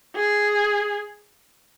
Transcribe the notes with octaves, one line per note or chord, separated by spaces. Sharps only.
G#4